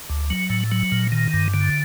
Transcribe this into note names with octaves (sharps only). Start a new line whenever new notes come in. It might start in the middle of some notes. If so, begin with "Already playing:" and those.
D2
F#3
A2
F#3
A#2
D#3
G2
D3